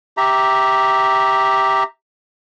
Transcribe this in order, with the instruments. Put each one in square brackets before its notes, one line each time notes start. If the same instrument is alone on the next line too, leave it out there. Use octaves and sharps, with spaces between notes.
[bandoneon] G4 E5 A#5